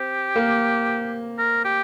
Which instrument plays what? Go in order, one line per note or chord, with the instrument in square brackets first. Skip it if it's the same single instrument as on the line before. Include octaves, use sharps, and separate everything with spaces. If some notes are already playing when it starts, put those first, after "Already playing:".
Already playing: [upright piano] C4 [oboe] G4
[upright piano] A#3
[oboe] A#4
G4